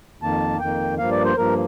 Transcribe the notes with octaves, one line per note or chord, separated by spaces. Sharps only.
F2 D#3 A#3 A5
F2 D#3 A#3 G5
G2 F3 A#3 F5
D5
C5
G2 F3 A#3 A#4